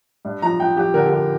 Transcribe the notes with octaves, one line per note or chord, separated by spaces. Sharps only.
G2
F3 A#5
F3 G5
F3 G4
D3 A#4
G4
D3